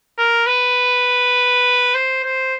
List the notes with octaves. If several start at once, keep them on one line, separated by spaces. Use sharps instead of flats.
A#4
B4
C5
C5